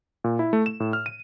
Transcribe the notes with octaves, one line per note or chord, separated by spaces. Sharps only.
A#2
E4
A3
E7
A2
F6
D#7